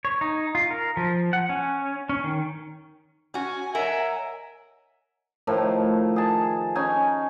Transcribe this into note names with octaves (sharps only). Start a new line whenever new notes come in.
C#5
D#4
F4
A#4
F3
F#5
C#4
C#4
D#3
C#4 F#4 G#5
A#4 C#5 D#5 E5 F#5
A2 D#3 F3
G#4 A5
C#4 D#4 G#5